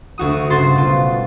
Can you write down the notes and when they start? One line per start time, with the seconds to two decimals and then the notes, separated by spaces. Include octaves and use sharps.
0.18 D2 F#4 D#6
0.50 G1 C#3 F#4 C5 C6 A6
0.76 B2 F4